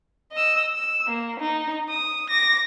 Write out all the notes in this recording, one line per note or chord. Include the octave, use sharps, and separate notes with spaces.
D#5 E6
E6
A#3
D#4
D#6
D6 A#6